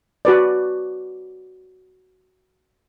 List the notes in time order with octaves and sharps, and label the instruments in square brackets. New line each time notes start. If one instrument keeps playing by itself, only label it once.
[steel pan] F#4 B4 D5